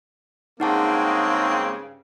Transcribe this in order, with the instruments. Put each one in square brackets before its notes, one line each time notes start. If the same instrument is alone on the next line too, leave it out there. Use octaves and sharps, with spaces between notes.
[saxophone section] G2 C#3 [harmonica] G#3 A#3 C4 [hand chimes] D#4 F#5 A5